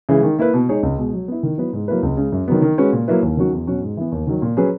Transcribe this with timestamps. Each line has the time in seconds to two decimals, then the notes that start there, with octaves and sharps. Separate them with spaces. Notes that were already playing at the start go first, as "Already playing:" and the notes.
0.09 C#3 E3 G#3
0.23 D#3
0.39 A#3 E4 B4
0.53 B2
0.68 G#3 D#4 G#4 C#5
0.83 C#2
0.98 B2 G#3
1.13 F#3
1.28 B3 E4
1.43 D#3
1.58 F#3 B3 E4 B4
1.73 G#2
1.88 F#3 A#3 E4 B4
2.03 C#2
2.17 C#3 G#3
2.32 F#2
2.48 D#3 F#3 B3
2.62 D#3
2.78 G#3 C#4 F#4 B4
2.93 A#2
3.08 F#3 A#3 E4 B4
3.23 D#2
3.37 D#3 F#3 C#4 F#4
3.53 E2
3.67 B2 F#3 C#4 F#4
3.82 G#2
3.97 E3 B3
4.12 D#2
4.27 D#3 F#3
4.42 A#2
4.57 F#3 C#4 G#4 B4